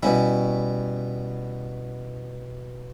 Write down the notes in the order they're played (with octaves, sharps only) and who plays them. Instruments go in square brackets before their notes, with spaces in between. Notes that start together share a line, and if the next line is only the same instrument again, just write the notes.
[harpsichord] B2 E4 [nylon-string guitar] G3 C#4